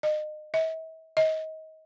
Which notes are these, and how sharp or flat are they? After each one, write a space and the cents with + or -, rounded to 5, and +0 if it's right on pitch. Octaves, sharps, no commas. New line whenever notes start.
D#5 -30
E5 -40
D#5 +25